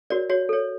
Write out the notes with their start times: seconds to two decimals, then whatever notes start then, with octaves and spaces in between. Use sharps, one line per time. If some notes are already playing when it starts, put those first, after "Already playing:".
0.10 F#4 A#4 C#5 D5
0.30 F#4 C#5
0.49 A4 C#5